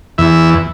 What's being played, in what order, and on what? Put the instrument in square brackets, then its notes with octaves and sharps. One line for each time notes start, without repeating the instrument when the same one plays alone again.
[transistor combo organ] E2 E5